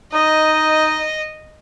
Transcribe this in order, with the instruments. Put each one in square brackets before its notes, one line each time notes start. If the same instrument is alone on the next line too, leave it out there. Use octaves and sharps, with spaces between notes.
[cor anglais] D#4 [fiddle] D#5